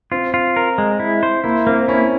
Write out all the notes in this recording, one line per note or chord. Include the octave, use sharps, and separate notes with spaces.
C4 F4
F4
A#4
G#3
E4
C5
A#3 E4
A#3 C4
C#4 E4